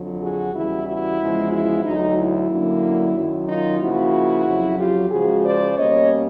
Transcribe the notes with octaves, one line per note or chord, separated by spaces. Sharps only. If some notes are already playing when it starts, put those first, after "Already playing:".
Already playing: F2 D3 F#3
F#4 G#4
E2 C#3 E3 G3 E4 F#4
E4 F#4
E2 C#3 F3 G#3
E4 F#4
D2 D3 F#3 D#4
E4
F#2 D3 F#3 A#3 D4
F#2 D#3 F#3
D#4 F4
C#3 F3 A#3 E4 F#4
F2 C#3 F#3
F4 G4
C#3 F3 G#3 F#4 G#4
C5 D5
B2 G3 A#3 C#4 C#5 D#5